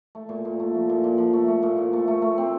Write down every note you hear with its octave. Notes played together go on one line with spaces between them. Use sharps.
A3
A#2
A#2
A3
F3
A#2
A#2
F3
A3
A3
A#2
A#2
A3
A3
A3
C4